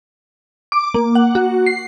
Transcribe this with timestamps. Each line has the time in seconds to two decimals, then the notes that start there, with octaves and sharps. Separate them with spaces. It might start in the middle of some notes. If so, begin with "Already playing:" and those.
0.72 D6
0.94 A#3
1.15 F#5
1.35 F#4
1.66 C7